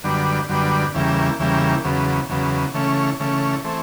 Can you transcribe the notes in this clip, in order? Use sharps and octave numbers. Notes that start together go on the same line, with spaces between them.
F#2 D3 G3 B3 D4
F#2 D3 G3 B3 D4
E2 C#3 E3 G3 A#3
E2 C#3 E3 G3 A#3
E2 C#3 F#3 B3
E2 C#3 F#3 B3
C#3 E3 A3 C#4
C#3 E3 A3 C#4
E3 A3 C4